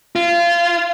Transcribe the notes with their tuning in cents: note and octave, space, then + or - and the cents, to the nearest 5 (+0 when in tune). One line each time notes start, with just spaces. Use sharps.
F4 -25